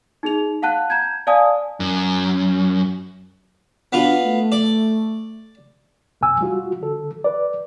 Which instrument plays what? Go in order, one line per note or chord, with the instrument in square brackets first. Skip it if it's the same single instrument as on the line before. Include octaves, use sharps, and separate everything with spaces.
[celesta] D#4 G#4 F7
F5 F#5 A5 F#6
A#5 G6 G#6
D5 F5 G#5 A5 D#6
[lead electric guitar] F#2
[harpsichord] B3 F4 [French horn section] D4 F#4
[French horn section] A3
[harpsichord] D5
[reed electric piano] C2 F2 B2 G#5 E6
G3 F4 F#4
D3 A4
B4 D5